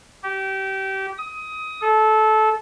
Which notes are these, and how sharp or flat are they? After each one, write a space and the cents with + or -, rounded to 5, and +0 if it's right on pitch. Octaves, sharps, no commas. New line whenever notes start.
G4 -25
D#6 +20
A4 -20